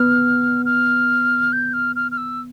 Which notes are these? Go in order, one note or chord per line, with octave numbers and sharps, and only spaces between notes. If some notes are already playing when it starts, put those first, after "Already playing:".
Already playing: B3 F6
F6
G6
F6
F6
F6
E6